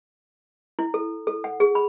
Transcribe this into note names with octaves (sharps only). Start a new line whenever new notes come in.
E4
A4
A4
F#5
G#4
B5